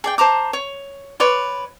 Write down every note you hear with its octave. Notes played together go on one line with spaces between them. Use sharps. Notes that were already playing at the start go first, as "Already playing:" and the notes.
G#4 D5 G5
C5 A5 A#5 D6
C#5
B4 C#5 D5 C6